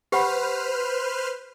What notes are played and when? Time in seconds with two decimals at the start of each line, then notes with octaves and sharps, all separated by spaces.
0.12 G4 B4 C5 F#5 B5 F6